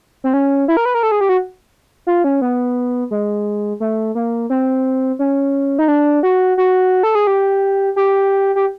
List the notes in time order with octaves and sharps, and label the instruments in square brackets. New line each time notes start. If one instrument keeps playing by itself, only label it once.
[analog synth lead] C4
C#4
E4
A#4
B4
A#4
A4
G#4
G4
F#4
F4
C#4
B3
G#3
A3
A#3
C4
C#4
D#4
D4
F#4
F#4
A4
G#4
G4
G4
G4